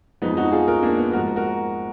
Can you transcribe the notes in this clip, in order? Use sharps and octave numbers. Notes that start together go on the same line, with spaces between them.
F2 F3 G#3 B3 D#4
D#4 F#4
F4 G#4
F#4 A#4
A#3 D4
B3
G#2 F3 G#3 F#4 A#4
F#4 A#4